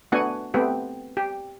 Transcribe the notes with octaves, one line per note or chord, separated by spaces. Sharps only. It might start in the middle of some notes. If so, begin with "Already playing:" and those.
A3 B3 D4 F#4 F#5 G#5
A3 B3 C4 G4
G4